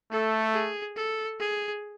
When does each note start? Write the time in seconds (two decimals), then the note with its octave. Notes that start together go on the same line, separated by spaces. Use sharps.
0.11 A3 A4
0.53 G#4
0.96 A4
1.39 G#4